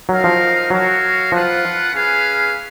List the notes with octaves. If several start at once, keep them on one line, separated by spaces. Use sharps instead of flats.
F#3 D#4 A#4 F5
F3
F#3 F#4 A#4 C#5 F5
F3 F4 B4 F#5
C#4 G#4 B4 F5